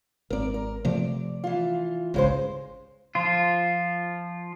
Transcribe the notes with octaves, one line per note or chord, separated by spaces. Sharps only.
G#1 C4 A#4 D5
A#4
C3 F3 A3 D5
E3 F4
G#1 C#2 C#3 G#3 C5
F3 F4